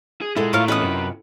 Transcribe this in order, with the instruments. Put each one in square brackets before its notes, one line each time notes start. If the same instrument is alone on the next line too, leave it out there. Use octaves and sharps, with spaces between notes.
[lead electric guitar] G#4
[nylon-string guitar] A#2 F#5 [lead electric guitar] G#3 [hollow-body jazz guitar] E4 A4
[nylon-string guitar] A2 [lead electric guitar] A3 A#4 [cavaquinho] F4 C#5 F5
[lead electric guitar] E2 [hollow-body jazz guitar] C#4 F4 D#5 [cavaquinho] B4 D#6
[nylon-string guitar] F#2 [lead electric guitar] C3